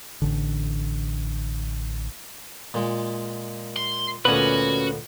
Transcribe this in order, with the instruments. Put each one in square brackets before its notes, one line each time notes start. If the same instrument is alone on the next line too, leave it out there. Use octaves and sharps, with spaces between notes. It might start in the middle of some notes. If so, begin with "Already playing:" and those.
[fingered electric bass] A1 D3
[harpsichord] A#2 G#3
[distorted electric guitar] C6
[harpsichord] D2 A#2 B3 [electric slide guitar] C#4 B4 [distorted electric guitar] F#4